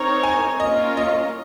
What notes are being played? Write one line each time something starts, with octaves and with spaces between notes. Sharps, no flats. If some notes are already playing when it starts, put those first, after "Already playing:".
Already playing: C4 D#4 A#4 C#5 A#5
G#5
A#3 C#4 F4 A#4 D#5
D#5